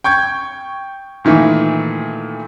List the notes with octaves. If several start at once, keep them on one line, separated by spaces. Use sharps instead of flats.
G5 C#6 G6 G#6
A#2 D#3 E3 A3